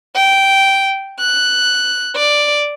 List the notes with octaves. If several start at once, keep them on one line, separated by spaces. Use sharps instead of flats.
G5
F#6
D5